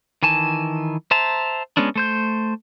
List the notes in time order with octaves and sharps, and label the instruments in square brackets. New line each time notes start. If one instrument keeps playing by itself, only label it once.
[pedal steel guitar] D#3 E3 G#5 A5
C5 E5 A5 A#5
G#3 B3 C#4 D4
A3 C5 G6